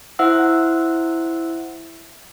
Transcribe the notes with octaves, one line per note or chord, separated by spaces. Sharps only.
E4 C5 E5 F#5 E6